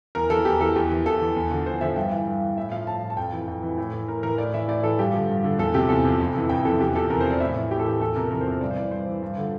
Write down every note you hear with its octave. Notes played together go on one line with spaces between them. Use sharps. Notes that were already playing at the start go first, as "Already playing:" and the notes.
E2 A#4
E3 A4
E2 G4
E3 A4
E2 G4
E3
E2 A4
E3
E2
D3 F3
E2 C5
D3 F3 E5
G2 G5
E3
G2
E3
A2 E5
F3 F5
A2 A5
F3
A5
F2 G5
E3
F2
E3
A2
E3
A2 A#4
E3 A#4
A2 D5
E3 E5
A2 D5
E3 A4
G2 G4
D3 F3
G2
D3 F3
E2 A4
C3 F3 G4
E2 A4
C3 F3
F2
C3 E3
F2 G5
C3 E3 A4
E2 G4
C3 F3 A4
E2 A#4
C5
C3 F3 D5
A2 E5
E3
A2 G4
A4
E3 G4
E2 A4
C3 F3 A#4
E2 A#4
C5
C3 F3
G2 D5
C5
E3 D5
G2 C5
E3
G2
D3 F3